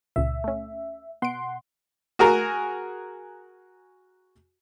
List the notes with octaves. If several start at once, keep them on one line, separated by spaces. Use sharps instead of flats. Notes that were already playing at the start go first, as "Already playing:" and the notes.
C#2 A#2 E5
A3 C#4
B2 F#5 C6 D7
F#4 G#4 A#4 G#5 A#5